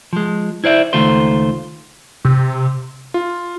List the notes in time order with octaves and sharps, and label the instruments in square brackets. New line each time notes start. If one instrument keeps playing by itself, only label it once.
[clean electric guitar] F3 G#3
E4 C5 D5 E5
C#2 D#3 A3 F4 C5
[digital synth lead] C3
[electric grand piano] F4